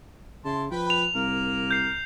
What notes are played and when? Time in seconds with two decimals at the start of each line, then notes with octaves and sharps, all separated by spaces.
0.45 C#3 E4 A5 C6
0.71 F3 B4 G5 B5
0.90 F7
1.15 C2 A#3 A#4
1.71 G6 C7